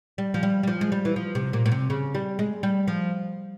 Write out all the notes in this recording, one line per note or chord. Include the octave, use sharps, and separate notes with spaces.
G3
F3
G3
G3
F3
G#3
G3
E3
F3
C3
A#2
A#2
C3
C#3
G3
G#3
G3
F3